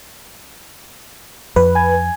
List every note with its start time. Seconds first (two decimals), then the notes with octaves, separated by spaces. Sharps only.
1.56 F2 B4
1.75 G#5 G#6